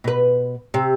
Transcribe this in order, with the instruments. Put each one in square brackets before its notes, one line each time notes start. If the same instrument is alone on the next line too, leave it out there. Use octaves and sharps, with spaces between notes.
[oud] B2 B4
C3